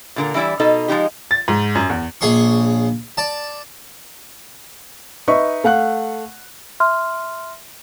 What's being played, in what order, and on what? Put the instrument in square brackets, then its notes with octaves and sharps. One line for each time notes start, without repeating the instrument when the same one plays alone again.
[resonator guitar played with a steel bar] A#2 D3 A#4
E3 G3 E4 D5 E5
B2 D#4 A4 D#5
F3 G#3 D#4 G4
[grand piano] A6
G#2
F#2
E2
[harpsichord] A#1 G#4 C#5 C6 C#6
D5 A5
[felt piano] D#4 B4 D#5 E5 C#6
A3 F5 F#5 F#6
[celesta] E5 C6 F6